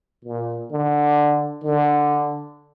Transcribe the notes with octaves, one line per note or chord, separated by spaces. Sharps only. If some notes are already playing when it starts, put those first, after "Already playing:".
A#2
D3
D3